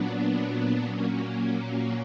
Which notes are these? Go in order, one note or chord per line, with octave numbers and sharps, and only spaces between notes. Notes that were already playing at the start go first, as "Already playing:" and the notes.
Already playing: A#2 F#3 B3 D4
A#2 F#3 A#3 C#4